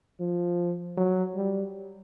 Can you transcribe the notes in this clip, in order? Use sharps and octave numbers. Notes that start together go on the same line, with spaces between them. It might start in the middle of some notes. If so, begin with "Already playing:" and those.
F3
F#3
G3